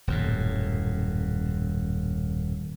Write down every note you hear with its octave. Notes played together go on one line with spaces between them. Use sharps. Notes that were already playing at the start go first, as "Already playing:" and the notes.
D#1 F#2 A2